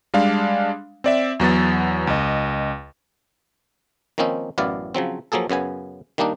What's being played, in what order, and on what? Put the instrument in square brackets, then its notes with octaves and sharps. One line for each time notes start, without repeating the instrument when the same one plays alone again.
[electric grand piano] G3 G#3 D4 F5
C4 D5 E5
E2 F#3 B3 A6
C#2 D#5
[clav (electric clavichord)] D#3 F3 A#3 C4 C#4 D#4
A1 F#2 B3 E4 D5 F5
C#3 F3 F#3 C4
F3 F#3 A#3 G#4 A4
F#2 C#3 B3 G#5
D#3 G3 A#3 D4 D#4